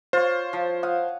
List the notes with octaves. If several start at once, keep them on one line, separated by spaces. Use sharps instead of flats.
F4 C5 C#5
F3
F5 F#5 D#6